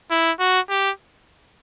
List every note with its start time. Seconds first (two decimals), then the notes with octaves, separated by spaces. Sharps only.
0.11 E4
0.40 F#4
0.70 G4